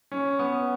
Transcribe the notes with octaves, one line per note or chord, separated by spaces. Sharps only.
C#4
B3